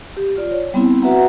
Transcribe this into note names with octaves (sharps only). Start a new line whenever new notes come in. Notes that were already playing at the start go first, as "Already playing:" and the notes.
G4
F4 D5
C#5
G3 B3 C4 E4
F#4 B4 E5 F#5 A#5